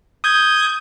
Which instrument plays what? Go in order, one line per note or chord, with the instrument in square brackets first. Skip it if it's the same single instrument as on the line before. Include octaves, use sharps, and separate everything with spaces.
[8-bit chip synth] D#6 G6 G#6